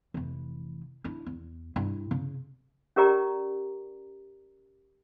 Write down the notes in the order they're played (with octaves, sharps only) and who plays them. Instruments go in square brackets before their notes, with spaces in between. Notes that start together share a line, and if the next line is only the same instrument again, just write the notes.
[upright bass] F1 E3
D4 E4
E2
G2 E4
C#3
[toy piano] C#4 G4 A#4 D5 A#5